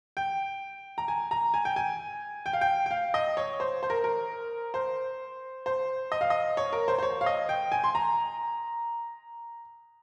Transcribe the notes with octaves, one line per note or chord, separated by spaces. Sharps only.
G5
A#5
G#5
A#5
G#5
G5
G#5
G5
F5
G5
G5
F5
D#5
C#5
C5
C5
A#4
A#4
C5
C5
D#5
F5
D#5
C#5
A#4
C5
C5
C#5
F5
D#5
G5
G#5
C6
A#5